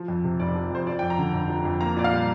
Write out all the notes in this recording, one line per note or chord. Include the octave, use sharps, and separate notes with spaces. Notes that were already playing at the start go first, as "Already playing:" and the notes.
Already playing: F3
F2
C3
F1 D5
F3
F2 C5
F3 D5
F2 G5
A#5
D3
F1
F3
F2
A#3 A#5
A#2 D5
F5
G3